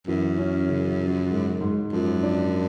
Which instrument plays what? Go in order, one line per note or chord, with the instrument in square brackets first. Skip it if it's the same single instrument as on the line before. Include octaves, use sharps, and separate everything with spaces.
[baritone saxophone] F#2 [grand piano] E3
[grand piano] C#4
C#3
F3
G#2
G#2
[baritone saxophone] F#2 [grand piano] F3
[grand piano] D4